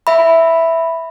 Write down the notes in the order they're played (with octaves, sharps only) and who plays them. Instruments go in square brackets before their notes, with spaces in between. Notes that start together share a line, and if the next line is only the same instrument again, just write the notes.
[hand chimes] E5 B5